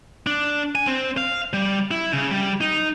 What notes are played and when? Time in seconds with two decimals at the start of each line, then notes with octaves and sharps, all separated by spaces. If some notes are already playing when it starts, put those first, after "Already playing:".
0.27 D4
0.75 G#5
0.87 C4
1.17 F5
1.53 G3
1.91 E4
2.13 C#3
2.31 G3
2.61 D#4